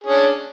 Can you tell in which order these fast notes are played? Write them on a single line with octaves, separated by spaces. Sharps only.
G#4 C#4 D4